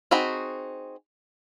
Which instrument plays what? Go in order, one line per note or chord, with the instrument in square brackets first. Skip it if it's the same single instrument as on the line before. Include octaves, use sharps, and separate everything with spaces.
[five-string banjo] C4 D#4 F#4 G#4 B5